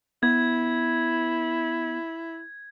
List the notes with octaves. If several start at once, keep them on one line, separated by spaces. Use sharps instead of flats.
B3 E4 G#6